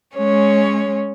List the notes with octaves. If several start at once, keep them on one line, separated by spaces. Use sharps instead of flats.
G#3 C#4 C#5